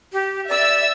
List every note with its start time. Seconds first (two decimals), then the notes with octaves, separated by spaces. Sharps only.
0.13 G4
0.48 D5 E5 E6